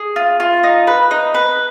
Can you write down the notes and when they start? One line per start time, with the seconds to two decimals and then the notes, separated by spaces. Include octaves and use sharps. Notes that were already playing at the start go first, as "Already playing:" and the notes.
Already playing: G#4
0.16 F4
0.40 F4
0.63 D#4
0.87 B4
1.11 D#4
1.34 B4